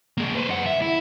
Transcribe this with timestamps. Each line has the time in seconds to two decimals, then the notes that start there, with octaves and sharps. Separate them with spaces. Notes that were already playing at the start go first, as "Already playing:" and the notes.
0.18 A#3 G#4
0.35 B4 C5
0.48 F#2 F#5
0.66 E5
0.82 E4